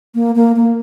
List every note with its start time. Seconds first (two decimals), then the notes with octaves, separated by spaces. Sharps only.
0.15 A#3
0.35 A#3
0.56 A#3